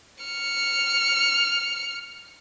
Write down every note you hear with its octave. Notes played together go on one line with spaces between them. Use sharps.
F6 C#7